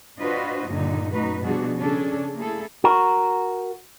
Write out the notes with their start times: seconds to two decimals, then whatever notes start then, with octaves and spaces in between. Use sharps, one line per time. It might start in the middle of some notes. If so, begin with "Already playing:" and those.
0.19 D4 F4 F#4 B4 C5 D#5
0.69 G2 A#2 D3 D#3 D#4
1.12 F#2 A3 D#4 F#4 B4
1.42 B2 F3 G3 D4 F#4 G#4
1.78 C#3 C#4 D4 G#4 A4
2.37 A3 A#3 E4 G#4 A4
2.84 F#4 A#4